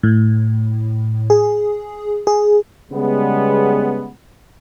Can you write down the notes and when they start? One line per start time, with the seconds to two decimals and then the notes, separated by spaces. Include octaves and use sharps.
0.03 A2
1.30 G#4
2.27 G#4
2.91 C#3 G3 G#3 B3